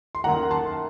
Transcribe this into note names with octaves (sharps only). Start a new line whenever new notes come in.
C6
F#2 D#3 A#3 F#5 A#5
A5 C6